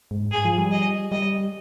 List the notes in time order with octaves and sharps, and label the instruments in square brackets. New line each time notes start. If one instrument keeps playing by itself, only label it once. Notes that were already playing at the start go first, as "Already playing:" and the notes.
[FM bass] G#2
[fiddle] G#4
[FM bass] F3
G3
[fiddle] D#5
[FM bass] G3 [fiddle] D#5